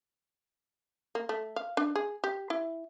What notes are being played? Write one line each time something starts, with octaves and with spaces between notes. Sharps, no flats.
A#3
A3
F5
D4
G#4
G4
E4